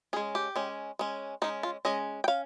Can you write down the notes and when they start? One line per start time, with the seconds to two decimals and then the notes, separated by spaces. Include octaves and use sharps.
0.13 C#4 G#4
0.16 G#3
0.35 G4
0.56 G#3 C#4
0.99 G#3 C#4
1.42 G#3 C#4 D#4
1.63 F4
1.85 G#3 C#4 D#5
2.24 G5
2.28 C#4 F5